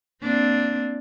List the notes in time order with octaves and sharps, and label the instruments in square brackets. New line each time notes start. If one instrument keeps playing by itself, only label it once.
[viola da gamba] A#3 C4 D4